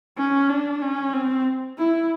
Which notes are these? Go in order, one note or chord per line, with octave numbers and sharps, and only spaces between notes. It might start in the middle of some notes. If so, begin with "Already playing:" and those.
C#4
D4
C#4
C4
E4